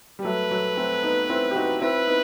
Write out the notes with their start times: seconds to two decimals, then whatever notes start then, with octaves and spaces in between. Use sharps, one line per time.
0.19 G3
0.25 F#3 A3 B4
0.51 F#3 A3
0.77 A3 C4
1.03 B3 D#4
1.29 C4 E4
1.51 G4
1.56 D#4 F#4
1.81 C4 E4 B4
2.07 B3 D#4